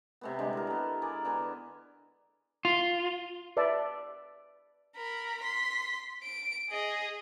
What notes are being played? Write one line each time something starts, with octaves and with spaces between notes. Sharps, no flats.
C3 A3 B3
D3 G3 G#3
E4 A#4
B3 A4
G#4 A#4 D5
D3 B3 G#5 A#5
F4
B4 D5 E5 A5
A#4 B5
C6 B6
D7
G#4 D#5